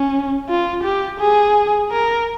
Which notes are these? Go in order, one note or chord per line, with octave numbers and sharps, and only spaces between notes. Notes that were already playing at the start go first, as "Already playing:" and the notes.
Already playing: C#4
F4
G4
G#4
A#4